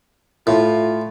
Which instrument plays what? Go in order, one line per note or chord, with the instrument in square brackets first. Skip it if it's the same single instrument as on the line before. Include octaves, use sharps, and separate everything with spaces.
[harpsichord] A2 [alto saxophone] F4